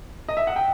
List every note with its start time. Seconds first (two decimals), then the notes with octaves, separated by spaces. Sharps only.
0.29 D#5
0.37 E5
0.47 F#5
0.56 G5